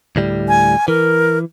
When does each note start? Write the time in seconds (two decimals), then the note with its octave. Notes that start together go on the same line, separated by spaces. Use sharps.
0.16 D2 A2 G3
0.48 G#5
0.88 E3 A#4